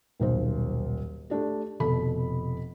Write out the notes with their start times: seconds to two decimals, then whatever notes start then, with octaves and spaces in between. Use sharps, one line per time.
0.20 D#1 B1 C5
1.30 A3 D4 G4
1.80 F1 B2 A4 B5